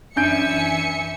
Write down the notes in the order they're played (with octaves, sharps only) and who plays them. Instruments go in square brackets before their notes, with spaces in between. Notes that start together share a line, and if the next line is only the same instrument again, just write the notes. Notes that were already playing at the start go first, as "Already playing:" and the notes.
[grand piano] F#2 G6 D7 [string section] E3 E5 C#7 [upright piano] D4 [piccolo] G#5